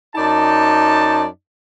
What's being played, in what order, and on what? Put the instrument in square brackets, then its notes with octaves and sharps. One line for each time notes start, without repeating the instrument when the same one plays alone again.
[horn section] F#2 D#4 D5 A5